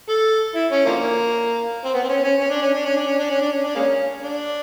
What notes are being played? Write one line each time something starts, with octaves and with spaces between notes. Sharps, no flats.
A4
E4
C#4
D3 F3 A#3
C4
B3
C4
C#4
C#4
C#4
D4
C#4
D4
C#4
D4
C#4
D4
C#4
D4
C#4
D4
G#3 A#3 C#4
D4